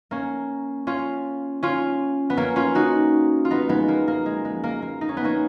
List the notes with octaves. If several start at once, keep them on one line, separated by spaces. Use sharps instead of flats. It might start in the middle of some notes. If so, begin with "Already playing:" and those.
A#3 C#4
C#4 F4
C#4 F4
B3
A#3 C#4
C#4 F4
D#4 F#4
F4
B3 D#4
G#3 B3
A#3
A#3
G#3
G#3
A#3
A#3
D#4
C#4
B3
A#3 C#4